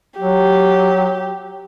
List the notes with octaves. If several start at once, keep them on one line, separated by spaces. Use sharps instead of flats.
F#3 G4